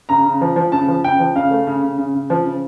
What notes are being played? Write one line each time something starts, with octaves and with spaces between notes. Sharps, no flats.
C#3 A#5
C#3
F3
F3
C#3 A5
F3
C#3 G5
F3
C#3 F5
A3
C#3
C#3
C#3
C#3
F3
C#3